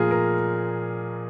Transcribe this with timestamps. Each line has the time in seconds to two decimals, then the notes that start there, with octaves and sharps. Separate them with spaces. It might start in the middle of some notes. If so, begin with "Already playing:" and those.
Already playing: A#2 F3 F4 G#4 A#4
0.11 A#4